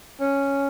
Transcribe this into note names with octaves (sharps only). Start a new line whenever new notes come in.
C#4